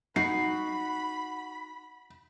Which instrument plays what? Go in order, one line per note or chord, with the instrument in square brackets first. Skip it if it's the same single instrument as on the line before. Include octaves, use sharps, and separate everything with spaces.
[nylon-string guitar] D#4 [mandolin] F#4 [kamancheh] B5 [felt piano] C7